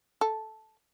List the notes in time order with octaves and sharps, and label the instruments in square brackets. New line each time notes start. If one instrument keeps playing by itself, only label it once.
[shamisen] A4